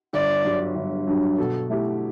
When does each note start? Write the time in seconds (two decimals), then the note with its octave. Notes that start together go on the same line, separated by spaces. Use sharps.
0.13 G1 D5
0.45 G2 D3 F#3
0.75 G1
1.07 G2 D3 F#3
1.38 B2 A4
1.70 A3 E4 G4